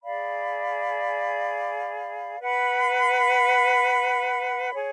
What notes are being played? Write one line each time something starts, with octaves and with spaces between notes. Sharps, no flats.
G#4 D5 F5 B5
B4 F#5 B5
G#4 C#5